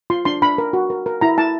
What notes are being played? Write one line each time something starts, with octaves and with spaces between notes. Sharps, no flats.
F4 C6
D4 C6
D4 B5
A#4
F#4
A#4
A#4
E4 A#5
E4 A5